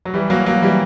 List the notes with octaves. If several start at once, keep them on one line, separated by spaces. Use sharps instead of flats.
F#3
E3 G3
F#3 A#3
F#3 A#3
E3 G3